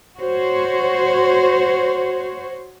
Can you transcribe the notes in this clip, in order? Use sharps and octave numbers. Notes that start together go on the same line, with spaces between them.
F#4 C5 C#5